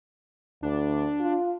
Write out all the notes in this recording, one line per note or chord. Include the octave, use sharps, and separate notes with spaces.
D2 D4
F4